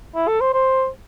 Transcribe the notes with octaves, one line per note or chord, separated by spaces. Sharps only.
E4
A4
C5
C5